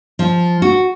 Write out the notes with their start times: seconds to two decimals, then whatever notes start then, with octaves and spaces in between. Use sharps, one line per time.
0.19 F3
0.62 F#4